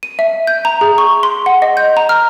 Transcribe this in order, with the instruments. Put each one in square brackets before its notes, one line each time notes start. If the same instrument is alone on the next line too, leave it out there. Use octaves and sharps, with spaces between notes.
[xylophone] D#7
E5
G6
A#5
G#4
C#6
C6
F#5
D#5
G6
A#5
F6